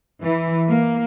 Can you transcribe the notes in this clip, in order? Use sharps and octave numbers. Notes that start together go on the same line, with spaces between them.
E3
A#3